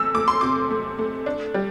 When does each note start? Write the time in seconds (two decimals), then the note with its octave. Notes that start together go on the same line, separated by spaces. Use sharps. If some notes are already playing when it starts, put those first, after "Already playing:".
Already playing: E2 C3 A3 E6
0.14 A3 D6
0.28 C6
0.41 C3 D6
0.70 A3
0.99 A3
1.26 D4
1.54 G3